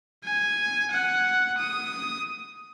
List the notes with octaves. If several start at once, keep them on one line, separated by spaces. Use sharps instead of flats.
G#5
F#5
D#6